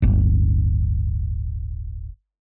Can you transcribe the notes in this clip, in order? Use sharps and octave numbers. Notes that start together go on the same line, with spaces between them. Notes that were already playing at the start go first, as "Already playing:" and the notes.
D1 G1